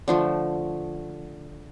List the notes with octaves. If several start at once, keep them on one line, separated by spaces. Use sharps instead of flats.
D3 F3 A3